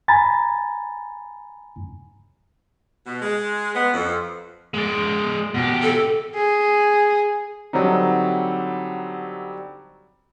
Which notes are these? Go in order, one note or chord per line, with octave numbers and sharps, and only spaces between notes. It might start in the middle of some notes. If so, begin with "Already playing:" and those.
G#5 A#5 B5 A6
B2
G#3
B3
F2
G#3 D5
B2 G4
A4
G#4
D3 F#3 G3 C4 D#4